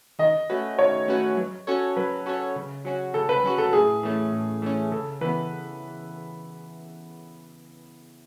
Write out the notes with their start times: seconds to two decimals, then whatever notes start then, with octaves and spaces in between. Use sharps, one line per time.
0.19 D#3 D#5
0.49 A3 C#4 F#4 B4
0.78 D#3 C#5
1.08 A3 C#4 F#4 B4
1.37 F#3
1.67 C#4 F#4 A4 C#5
1.96 F#3 B4
2.26 C#4 F#4 A4 C#5
2.56 C#3
2.85 F#3 C#4 F#4
3.14 C#3 A4
3.29 B4
3.43 F#3 C#4 F#4
3.58 A4
3.73 A2 G#4
4.03 E3 A3 C#4
4.32 A2
4.62 E3 A3 C#4
4.92 C#3 A4
5.21 E3 B3 B4